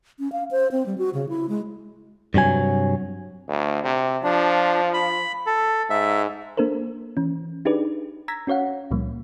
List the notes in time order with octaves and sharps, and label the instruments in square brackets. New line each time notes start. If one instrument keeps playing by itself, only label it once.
[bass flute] C#4
F5
C5
C4
G3
F#4
C#3
E4
G#3
[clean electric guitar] G2 C3 F#3 G#5
[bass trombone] D2
C3
[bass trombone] F3 [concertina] D4
[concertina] B5
A4
[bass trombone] G#2 [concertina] E5
[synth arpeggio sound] A#3 D4 A4 A#4 C5
E3 C#4
D4 D#4 G4 G#4 B4 D5
A#5 E6 G#6 A#6 B6
C#4 F#4 C#5 F5 F#5
C#2 A#2 F3 G3 A#3